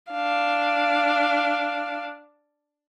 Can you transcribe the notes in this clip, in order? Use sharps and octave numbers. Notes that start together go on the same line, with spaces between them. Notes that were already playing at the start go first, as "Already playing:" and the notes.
D4 F5